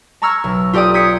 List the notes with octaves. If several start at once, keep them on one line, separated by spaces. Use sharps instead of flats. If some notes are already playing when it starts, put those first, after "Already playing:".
A5 A#5 C#6 E6 F6 G#6
B1
F4 G4 A4 D5 G5 D#6
D#6 G6 G#6 B6 C#7 D#7